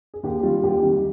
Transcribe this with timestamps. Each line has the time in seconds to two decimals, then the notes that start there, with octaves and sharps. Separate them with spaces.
0.14 G#4
0.23 D#2 G4
0.38 G4
0.43 D#3 G3 F4
0.63 D#2 G4
0.82 D#3 G3